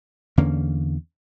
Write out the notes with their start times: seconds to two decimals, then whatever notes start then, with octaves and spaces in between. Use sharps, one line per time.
0.37 E2 D3 A#3 C#4